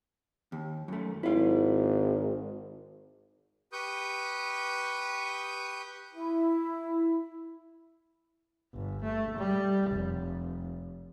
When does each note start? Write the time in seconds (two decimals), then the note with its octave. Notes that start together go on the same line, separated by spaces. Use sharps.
0.52 D#2
0.88 F#2 A3
1.23 G#1 E4 F5
3.73 G4 B4 C#6 D#6 G6
6.11 E4
8.74 G1
9.03 A3
9.37 G3
9.91 F1